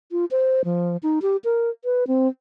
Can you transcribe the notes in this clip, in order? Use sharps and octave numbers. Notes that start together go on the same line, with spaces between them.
F4
C5
F3
D#4
G4
A#4
B4
C4